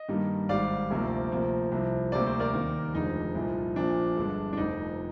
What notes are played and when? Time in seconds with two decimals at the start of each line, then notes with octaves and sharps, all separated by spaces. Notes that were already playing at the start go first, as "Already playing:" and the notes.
Already playing: D#5
0.09 G2 D#3 G3 A#3
0.49 G#1 G#2 G3 D5 F5
0.90 D2 C3 F3 A#3
1.32 D2 C3 F3 A#3
1.71 C2 C3 F3
2.12 D2 C3 G3 A#3 D5
2.26 C5
2.39 A#4 D5
2.53 D#2 D#3 A#3
2.94 F1 F2 D3 G#3 D#4
3.35 C2 A#2 F3
3.75 A#1 A#2 F3 A#3 D4
4.16 G1 G2 D3 G#3
4.53 D4
4.57 F1 F2 D3 D#4